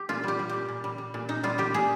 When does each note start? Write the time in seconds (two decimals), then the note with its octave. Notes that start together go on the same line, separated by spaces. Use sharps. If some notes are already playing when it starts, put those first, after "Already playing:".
Already playing: G4
0.09 A#2 F4
0.24 G3 G4
0.39 G3
0.49 A#2 G4
0.69 A#2
0.84 G3
0.98 G3
1.14 A#2
1.29 A#2 D#4
1.43 G3 F4
1.58 G3 G4
1.74 A#2 G#4